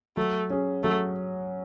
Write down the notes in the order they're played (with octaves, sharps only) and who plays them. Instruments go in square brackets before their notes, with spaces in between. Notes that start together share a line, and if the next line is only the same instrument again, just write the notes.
[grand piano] F#3 [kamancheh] A3
[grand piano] C#4 G#4
[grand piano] F#3 [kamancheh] A3